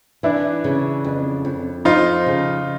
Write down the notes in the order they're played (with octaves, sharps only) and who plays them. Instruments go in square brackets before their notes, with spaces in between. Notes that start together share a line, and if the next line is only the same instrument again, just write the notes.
[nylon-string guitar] E3 [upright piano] D4 E4
[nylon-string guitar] C#3
F2
F2
[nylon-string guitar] F3 [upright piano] D#4 F4
[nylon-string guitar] C#3